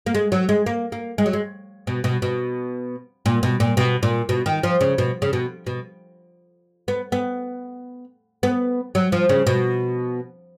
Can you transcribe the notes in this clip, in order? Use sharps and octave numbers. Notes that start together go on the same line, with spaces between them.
A#3
G#3
F#3
G#3
A#3
A#3
G#3
F#3
G#3
B2
B2
B2
A#2
B2
A#2
B2
A#2
B2
D#3
F3
C#3
B2
C#3
B2
B2
B3
B3
B3
F#3
F3
C#3
B2